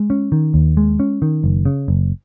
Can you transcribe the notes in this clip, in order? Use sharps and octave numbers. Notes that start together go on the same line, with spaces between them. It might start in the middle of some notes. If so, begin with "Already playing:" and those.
Already playing: G#3
C#4
D#3
D#2
G#3
C#4
D#3
F#1
C#3
F#1